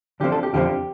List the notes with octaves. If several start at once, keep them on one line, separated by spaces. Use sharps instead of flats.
D3 F3 C4 G4
A4
G4
F2 D3 F3 C4 G4